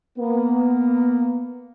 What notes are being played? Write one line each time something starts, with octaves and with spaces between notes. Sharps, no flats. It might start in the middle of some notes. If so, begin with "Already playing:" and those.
A#3 B3